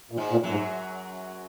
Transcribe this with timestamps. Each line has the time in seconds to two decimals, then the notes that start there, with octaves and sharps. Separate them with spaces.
0.11 A#2
0.17 G#2 G#3
0.31 A#2
0.43 F#2 F#3
0.50 G#2